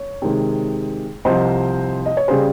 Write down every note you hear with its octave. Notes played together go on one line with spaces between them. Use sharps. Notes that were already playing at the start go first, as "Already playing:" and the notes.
Already playing: C#5
C3 D#3 G#3
C2 C3 F3 C5 D#5
D#5
C#5
C#3 G3 G#4 C5